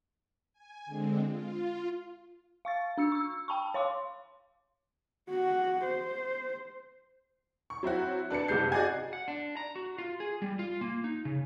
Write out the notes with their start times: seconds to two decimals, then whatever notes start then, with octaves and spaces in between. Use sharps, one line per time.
0.53 G#5
0.86 D3 G#3 C4
1.24 F4
2.65 F5 C#6 A6
2.98 D4 E6 C#7
3.12 C#6 E6
3.48 G5 A5 B5 C#6
3.74 C#5 F5 C6 D6
5.30 F#4
5.85 C5
7.70 C#6
7.83 F#3 C4 E4 F#4
8.30 D4 B4 A5 C#7
8.48 F#1 C3 G#3 A5 G6 C7
8.72 F#4 G#4 D5 D#5 G#5
9.13 F#5
9.28 D4
9.57 A#5
9.76 F#4
9.98 F4
10.20 G#4
10.42 G3
10.59 F4
10.81 A#3
11.04 D#4
11.25 C#3